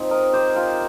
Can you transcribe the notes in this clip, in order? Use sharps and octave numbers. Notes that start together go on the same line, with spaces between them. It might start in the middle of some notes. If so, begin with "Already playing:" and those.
Already playing: F3 C4 D#4
A#4 D#5
G4 C5
F4 A#4